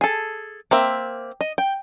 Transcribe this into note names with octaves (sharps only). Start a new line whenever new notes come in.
G#4 A4
A#3 C4 E5
D#5
G5